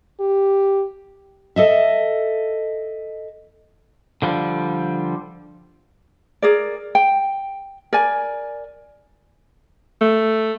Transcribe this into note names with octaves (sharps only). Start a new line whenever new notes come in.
G4
A4 D#5 E5
D3 F3 G3
G#4 A#4 D5
G5
A#4 D5 G#5
A3